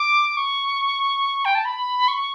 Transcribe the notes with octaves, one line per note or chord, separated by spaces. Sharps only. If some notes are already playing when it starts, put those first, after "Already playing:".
Already playing: D6
C#6
G5
A5
B5
C#6